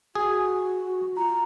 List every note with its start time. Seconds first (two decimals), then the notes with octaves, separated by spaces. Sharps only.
0.15 F#4 G#4
1.17 F4 A#5